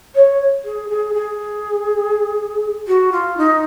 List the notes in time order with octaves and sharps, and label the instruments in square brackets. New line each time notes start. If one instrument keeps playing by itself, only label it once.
[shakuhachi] C#5
G#4
G#4
G#4
F#4
F4
D#4